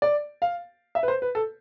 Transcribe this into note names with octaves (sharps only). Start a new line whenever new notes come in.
D5
F5
E5
B4
C5
B4
A4